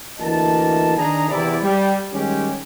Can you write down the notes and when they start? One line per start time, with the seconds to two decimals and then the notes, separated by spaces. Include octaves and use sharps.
0.20 D2 E3 A#3 D#5 A5
0.98 D#3 D4 G#4 A#5
1.30 E2 C3 E4 D5
1.61 G3
2.13 D#3 G3 G#3 C#4 G4